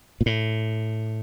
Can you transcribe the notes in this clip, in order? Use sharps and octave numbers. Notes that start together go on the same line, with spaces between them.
A#2
A2